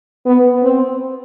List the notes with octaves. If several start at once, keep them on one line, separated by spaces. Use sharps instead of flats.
B3
C4